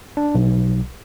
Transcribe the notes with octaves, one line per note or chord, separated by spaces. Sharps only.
D4
B1